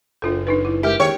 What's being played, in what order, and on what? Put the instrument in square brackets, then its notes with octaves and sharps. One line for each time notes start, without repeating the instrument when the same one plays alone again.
[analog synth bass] F#1 [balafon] D4 F4 A4
[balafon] D4 D#4 B4
E4
[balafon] G#3 A#4 E5 [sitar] G4
[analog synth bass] D#2 [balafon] G4 G#4 G5 [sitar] C#5